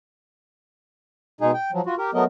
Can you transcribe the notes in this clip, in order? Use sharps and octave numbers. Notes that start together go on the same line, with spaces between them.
B2 G#3 D#4 G#4
G5
F3 F#3
F4 F#4
G4 A#4
F#3 A3 B3 A#4 D#5